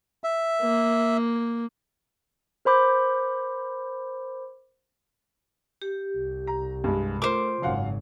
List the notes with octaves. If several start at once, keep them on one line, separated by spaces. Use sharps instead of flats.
E5
A#3
A#4 C5 B5 D6 G6
G4
C2
A#5
G2 G#3
A3 F4 A#4 C5 D6
G#1 F#2 C#3 F5 F#5